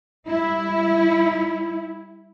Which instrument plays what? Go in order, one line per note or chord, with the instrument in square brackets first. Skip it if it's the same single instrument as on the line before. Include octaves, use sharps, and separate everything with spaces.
[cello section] G3 E4